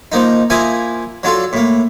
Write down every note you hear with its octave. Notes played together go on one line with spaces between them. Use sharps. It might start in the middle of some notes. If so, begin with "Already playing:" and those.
F3 A#3 D#4
F3 A#3 E4 G#5 D#6
F#3 D4 F4 A4
A2 A#3